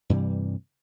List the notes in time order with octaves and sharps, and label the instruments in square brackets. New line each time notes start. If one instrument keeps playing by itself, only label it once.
[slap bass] G2 C3 E3 G3